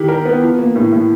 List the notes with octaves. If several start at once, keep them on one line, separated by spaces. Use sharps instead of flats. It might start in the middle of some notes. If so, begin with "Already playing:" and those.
Already playing: D#3 E4 G4
A#4
B3
F3
A#3
A2
A2